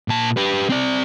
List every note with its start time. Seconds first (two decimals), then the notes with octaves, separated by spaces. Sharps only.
0.08 A#2 A5
0.37 G4 B4
0.69 C4 D5